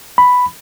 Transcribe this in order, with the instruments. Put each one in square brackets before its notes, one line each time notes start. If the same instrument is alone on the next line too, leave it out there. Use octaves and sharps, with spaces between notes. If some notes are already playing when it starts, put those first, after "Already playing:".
[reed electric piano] B5